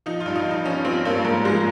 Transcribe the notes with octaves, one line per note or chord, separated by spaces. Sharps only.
F3 D#4
F4
G2
D#4
F3
D#4
F3 C#4
F3 C4
G2 A#3
G#2 A#3
F3 G#3